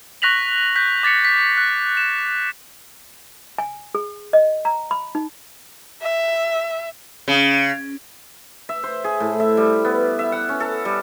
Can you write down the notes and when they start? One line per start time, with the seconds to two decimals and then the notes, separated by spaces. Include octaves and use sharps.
0.22 C#6 F#6 A#6 B6 F7 F#7
0.76 F#6 G6 B6
1.03 D6 A6 B6 C#7
1.25 B6
1.58 F#6
1.97 E7
3.58 G#5
3.95 G#4
4.33 D#5
4.65 A#5
4.91 B5
5.15 D#4
6.02 E5
7.28 C#3
8.69 E5
8.84 C5
9.04 G#4
9.20 A2
9.40 E5
9.57 G3
9.85 B3
10.19 E5
10.32 F#5
10.49 C#4
10.60 A4
10.85 G3